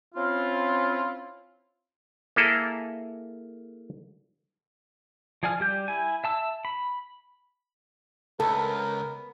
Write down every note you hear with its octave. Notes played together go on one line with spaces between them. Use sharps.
C4 C#4 E4 F4
A#3 E4 G#4 A4
F3 G#4 D5 G#5 F6
G3 G4 G6
E4 G#5
E5 A5 E6
B5
C#2 B3 A4 A#4